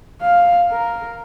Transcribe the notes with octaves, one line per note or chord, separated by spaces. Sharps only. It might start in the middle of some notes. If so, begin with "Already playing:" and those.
F5
A#4